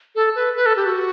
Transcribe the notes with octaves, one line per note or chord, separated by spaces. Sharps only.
A4
B4
B4
A4
G4
F#4